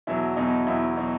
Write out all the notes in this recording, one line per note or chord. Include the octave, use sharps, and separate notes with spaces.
E2 B2 F#3 E4
E2 B2 F#3 D#4
E2 B2 F#3 E4
B2 F#3 D#4